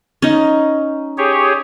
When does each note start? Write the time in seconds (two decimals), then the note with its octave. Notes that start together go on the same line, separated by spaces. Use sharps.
0.22 C#4 D#4
1.18 G4 G#4 C#5